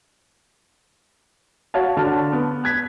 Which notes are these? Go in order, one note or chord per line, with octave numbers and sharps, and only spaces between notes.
F#4 C#5 F5 F#5 A5
D3 F#4 A5 F6
B3
F#6 G#6 B6